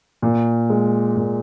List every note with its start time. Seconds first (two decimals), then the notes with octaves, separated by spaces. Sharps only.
0.22 A#2
0.70 G#3
1.17 A#2